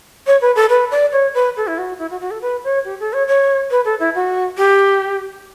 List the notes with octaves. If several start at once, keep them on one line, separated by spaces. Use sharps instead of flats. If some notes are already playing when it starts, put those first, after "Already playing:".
C#5
B4
A4
B4
D5
C#5
B4
A4
E4
F#4
E4
F#4
F#4
A4
B4
C#5
G4
A4
C#5
C#5
B4
A4
E4
F#4
G4